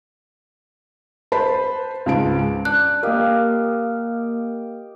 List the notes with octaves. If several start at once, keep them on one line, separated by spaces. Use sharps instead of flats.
B4 C5 A5 B5
C#2 G#2 A5 D7
D4 F#6
A#3 G4 A#4 D#5 F5